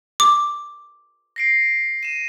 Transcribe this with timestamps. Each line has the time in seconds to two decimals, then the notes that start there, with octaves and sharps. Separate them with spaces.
0.20 D6
1.36 A#6 C7 D7
2.03 D#7 E7